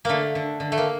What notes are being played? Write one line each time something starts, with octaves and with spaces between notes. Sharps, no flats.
D3 A3 A#3
D3
D3
A3
A#3